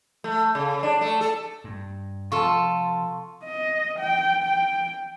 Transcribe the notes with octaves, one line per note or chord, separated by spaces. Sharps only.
A3
C#3
D4
A3
A4
G2
C3 F3 F4 A4 A5 C6 C#6
D#5
G5
G5